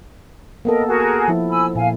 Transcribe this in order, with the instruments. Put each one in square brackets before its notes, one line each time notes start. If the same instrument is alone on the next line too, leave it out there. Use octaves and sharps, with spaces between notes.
[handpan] A#3 B3 A4 [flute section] A#4 D#5
[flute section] F#4 G#4 A#4
[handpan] F3 E4
[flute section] G#5 B5 E6
[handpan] A#2 [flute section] F5 G#5